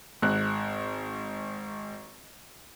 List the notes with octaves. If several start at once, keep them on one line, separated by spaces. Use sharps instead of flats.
G#1 F#6